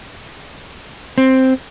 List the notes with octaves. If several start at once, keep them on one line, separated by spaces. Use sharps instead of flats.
C4